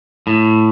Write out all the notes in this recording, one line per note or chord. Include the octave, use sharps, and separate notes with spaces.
A2